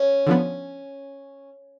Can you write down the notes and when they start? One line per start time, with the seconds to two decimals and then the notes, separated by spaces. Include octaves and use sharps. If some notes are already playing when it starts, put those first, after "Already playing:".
Already playing: C#4
0.27 D3 F3 B3